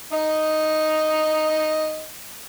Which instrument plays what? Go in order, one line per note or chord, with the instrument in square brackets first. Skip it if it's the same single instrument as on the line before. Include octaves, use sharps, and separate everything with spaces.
[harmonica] D#4 D#5